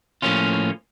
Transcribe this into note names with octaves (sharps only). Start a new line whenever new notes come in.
A2 F3 A#3 C#4 F4